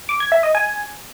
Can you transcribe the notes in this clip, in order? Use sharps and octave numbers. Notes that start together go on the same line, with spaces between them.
D6
G#6
E5
D#5
G#5